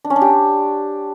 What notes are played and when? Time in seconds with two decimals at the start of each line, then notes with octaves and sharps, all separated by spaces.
0.05 D4
0.10 C#4
0.16 D4
0.21 G4